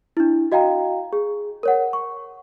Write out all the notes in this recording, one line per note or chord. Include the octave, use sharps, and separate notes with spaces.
D4 E4
F#4 D#5 F5 G5 A#5
G#4
A#4 C#5 F#5
C#6